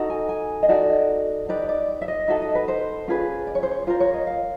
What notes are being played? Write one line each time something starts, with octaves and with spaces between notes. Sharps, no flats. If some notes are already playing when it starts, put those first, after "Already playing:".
Already playing: D#4 F#4 A4
G#5
G#5
D#5
D#4 F#4 A4 D5
D#4 G4 B4 D5
D5
E5
D#5
D#4 F#4 A4 E5
D#5
B4
C5
C#4 F4 G#4 B4
D5
C#5
C5
C#5
F4 A#4 C5
C#5
D#5
F5